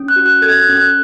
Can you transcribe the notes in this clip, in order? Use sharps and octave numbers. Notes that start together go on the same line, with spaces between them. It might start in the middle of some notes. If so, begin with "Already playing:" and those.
Already playing: C#4
F#6
F#4
F#6
A4 G#6
F#6
C#4
F#6